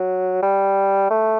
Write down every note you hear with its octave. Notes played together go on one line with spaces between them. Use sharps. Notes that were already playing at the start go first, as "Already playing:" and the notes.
Already playing: F#3
G3
A3